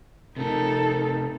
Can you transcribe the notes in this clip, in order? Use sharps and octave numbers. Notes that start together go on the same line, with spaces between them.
C3 A3 D#4 A4 A#4